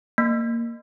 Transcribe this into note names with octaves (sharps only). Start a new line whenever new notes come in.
A#3